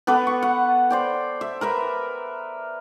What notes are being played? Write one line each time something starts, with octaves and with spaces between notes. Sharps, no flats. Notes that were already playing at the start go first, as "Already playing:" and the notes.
B3 A4 B4 D6
C#6
F#5
C5 D5 G5
E5
A#4 B4 E5